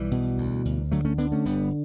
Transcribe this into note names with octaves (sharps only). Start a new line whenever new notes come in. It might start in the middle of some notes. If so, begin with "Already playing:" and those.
Already playing: B1 E3 G3
B2
D2
D2
D3 F#3 A3
A3 C#4
D3 B3 D4
A3 C#4
G1 G3 B3